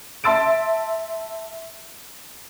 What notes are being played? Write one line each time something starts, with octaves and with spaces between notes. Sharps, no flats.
E5 A5 C6 E6 A6 D7